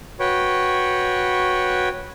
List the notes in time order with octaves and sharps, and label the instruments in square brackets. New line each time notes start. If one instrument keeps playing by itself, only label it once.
[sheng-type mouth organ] F#4 B4 C#5 G5